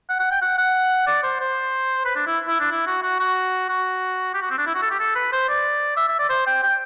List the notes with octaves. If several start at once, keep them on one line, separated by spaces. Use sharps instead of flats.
F#5
F#5
G5
F#5
F#5
D5
C5
C5
B4
D4
E4
E4
D4
E4
F#4
F#4
F#4
F#4
G4
F#4
C4
D4
E4
F#4
A4
G4
A4
B4
C5
D5
E5
E5
D5
C5
G5
G5